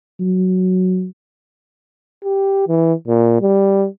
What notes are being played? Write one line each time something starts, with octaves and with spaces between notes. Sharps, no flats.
F#3
G4
E3
A#2
G3